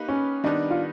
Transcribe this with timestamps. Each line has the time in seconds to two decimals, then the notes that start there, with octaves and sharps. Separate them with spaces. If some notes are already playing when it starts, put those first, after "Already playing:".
Already playing: A#3 D#4 G4 B4
0.09 C#4
0.44 D#3 G3 B3 D4 D#4
0.70 F4